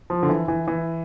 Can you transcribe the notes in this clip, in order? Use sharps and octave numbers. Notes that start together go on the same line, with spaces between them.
F3
D3
E3
E3
E3